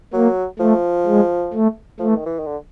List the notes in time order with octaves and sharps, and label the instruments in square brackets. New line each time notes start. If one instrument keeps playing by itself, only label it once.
[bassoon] F#3 [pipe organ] A#3
[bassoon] F3 [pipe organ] A3
[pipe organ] G#3
A3
[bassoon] F3 [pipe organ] A3
[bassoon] E3
D#3
E3
D#3
D3